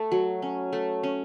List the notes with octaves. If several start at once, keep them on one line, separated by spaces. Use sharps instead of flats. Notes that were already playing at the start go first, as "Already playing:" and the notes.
Already playing: A3
F#3
C#4
A3
C#4